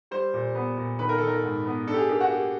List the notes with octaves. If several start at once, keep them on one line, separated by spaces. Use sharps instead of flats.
G3 C5
A#2
B3
A#2
D#3 B4
A#4
D#3 A4
A#4
G#2
B3
D4 A4
G4
G#4
A#3 G4
F#4
A#3 G4